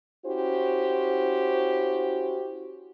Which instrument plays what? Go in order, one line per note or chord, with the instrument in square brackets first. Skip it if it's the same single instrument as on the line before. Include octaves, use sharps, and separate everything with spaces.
[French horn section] C#4 E4 F#4 G4 C5